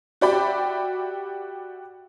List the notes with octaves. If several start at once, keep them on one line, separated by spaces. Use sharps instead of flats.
F#4 G4 D5 E5 G5 B5